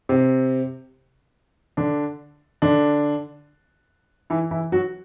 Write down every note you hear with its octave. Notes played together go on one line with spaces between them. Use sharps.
C3 C4
D3 D4
D3 D4
E3 E4
E3 E4
F#3 F#4